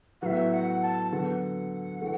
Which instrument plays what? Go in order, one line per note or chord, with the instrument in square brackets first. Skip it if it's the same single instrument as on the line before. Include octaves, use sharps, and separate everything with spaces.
[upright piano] A2 F#3 B3 [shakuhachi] E5 F#5
[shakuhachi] F#5
A5
[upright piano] D3 F#3 B3 [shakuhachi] F#5
[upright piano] E3 A3